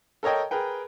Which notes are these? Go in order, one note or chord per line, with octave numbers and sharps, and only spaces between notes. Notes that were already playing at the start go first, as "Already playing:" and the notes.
A4 A#4 C#5 D#5 G5
G#4 A#4 B4 G5